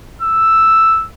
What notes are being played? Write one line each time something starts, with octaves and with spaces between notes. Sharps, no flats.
E6